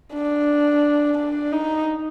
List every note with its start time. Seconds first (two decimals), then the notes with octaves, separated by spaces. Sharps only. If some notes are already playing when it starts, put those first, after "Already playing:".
0.14 D4
1.18 D4
1.52 D#4